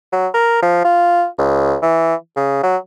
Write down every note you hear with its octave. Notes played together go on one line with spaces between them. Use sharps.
F#3
A#4
F3
F4
C#2
E3
C#3
F#3